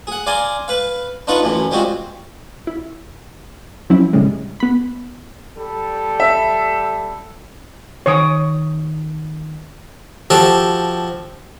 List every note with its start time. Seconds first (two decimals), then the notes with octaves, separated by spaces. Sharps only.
0.07 G#4 F#5
0.27 D5 F5 G#5 A#5 C6
0.68 B4 F5
1.27 D4 D#4 F4 B4 F#5 C#6
1.42 F#2 A2 E3
1.71 G3 G#3 C4 F4 F#4
2.67 E4
3.90 F3 F#3 C4 C#4 E4
4.13 B1 A2 C#3 G3 G#3
4.60 B3 B5
5.58 G3 A4
6.20 E5
8.06 D#3 C#5 C#6 D#6 D7
10.30 F3 F#4 G4 A4